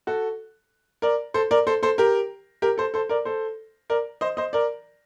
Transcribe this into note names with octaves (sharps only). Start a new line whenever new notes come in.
F#4 A4
A#4 D5
A4 C5
A#4 D5
A4 C5
A4 C5
G4 A#4
G4 A#4
A4 C5
A4 C5
A#4 D5
A4 C5
A#4 D5
C5 D#5
C5 D#5
A#4 D5